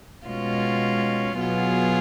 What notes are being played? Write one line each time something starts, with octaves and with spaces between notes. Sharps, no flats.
B2 G#3 C#4 F4
B2 F#3 B3 F4 G#4